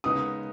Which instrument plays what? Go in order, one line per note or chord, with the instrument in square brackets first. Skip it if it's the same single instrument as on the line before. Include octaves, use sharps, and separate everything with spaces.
[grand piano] C#3 G#3 B3 D#4 [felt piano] D#6